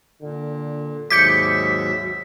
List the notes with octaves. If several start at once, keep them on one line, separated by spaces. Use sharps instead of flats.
A#2 D3
D#2 G#2 F#3 E5 D6 G6 B6 C#7